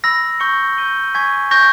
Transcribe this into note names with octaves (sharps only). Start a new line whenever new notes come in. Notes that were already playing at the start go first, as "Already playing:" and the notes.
B5 E6 A#6
C#6 G6 C#7 G7
G6 A#6 D#7 G7
G#5 C#6 G#6 B6
C#6 G6 A#6